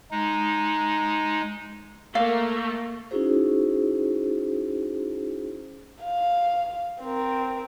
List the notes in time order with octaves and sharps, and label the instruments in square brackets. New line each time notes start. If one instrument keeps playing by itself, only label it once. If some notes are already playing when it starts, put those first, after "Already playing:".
[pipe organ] G#3 D#4
[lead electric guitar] A3 [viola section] A#3 [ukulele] F5
[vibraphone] C#4 D#4 E4 F#4 G#4 C5
[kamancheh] F5
C4 A#4